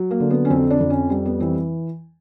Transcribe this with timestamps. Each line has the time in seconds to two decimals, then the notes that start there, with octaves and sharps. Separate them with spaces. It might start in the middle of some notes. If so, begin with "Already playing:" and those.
Already playing: F#3
0.11 A#3
0.20 D3
0.30 B3
0.45 C#4
0.50 F2 C4
0.70 D4
0.80 F2
0.90 C#4
1.10 G3 C4
1.25 B3
1.40 E3 C4